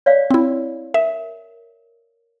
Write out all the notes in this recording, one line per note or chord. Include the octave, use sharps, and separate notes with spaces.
C#5 D5 F5
C4 E4
A#4 E5